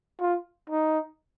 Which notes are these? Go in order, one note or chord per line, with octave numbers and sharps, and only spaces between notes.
F4
D#4